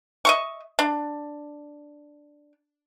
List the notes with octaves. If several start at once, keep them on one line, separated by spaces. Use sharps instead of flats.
D#5 E5 C#6
D4